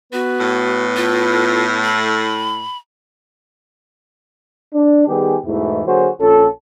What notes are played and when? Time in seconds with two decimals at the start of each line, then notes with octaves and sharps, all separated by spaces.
0.13 B3 F#4 B4
0.39 A2
0.96 F4
1.84 B5
4.74 D4
5.07 D#3 G3 B3 G4 G#4
5.45 E2 G#2 B2 E3 A3 E4
5.85 D3 F#3 A#3 F#4 G#4 C5
6.20 A#1 C#4 F4 A4